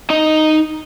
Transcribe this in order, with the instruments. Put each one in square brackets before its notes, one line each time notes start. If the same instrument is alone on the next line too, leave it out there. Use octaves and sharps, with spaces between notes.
[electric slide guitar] D#4 D#5